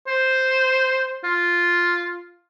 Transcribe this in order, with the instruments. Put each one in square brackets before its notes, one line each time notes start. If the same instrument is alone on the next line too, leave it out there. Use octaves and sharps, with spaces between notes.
[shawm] C5
F4